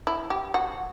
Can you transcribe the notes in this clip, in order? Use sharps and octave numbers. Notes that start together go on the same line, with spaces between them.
E4
G4
F#4